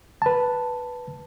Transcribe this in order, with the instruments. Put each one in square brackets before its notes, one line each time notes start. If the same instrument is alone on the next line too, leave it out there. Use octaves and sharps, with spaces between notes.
[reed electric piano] B4 A5